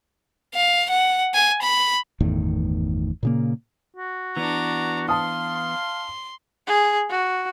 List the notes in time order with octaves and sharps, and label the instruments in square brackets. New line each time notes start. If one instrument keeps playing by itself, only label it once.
[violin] F5
F#5
G#5
B5
[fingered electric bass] G1 E2 A2 D#3
A#2 C#3 A#3
[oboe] F#4
[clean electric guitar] E3 B3 [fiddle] D4 A#5
[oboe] F5 [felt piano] A5 D#6 [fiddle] C6
[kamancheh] G#4
F#4